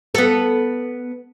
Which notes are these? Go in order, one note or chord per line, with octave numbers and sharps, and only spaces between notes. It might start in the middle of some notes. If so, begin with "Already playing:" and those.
B3 A4